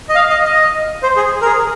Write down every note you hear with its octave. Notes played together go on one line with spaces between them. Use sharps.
D#5
F5
D#5
D#5
C5
G#4
A#4
G#4